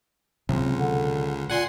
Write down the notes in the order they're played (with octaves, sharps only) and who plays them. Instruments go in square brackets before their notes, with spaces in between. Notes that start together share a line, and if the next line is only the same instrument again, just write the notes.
[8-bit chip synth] C#2 [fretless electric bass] C3 F#3 C4
[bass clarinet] D3
[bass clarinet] A#2 [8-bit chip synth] F#5 G#5 C6